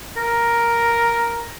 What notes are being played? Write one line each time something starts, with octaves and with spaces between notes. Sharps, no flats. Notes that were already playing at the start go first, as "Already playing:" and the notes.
A#4